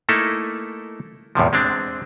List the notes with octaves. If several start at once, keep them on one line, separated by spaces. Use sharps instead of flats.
A3 A#3 D#4 E4 A4
E2 A2 C3 F3
G#3 C4 D4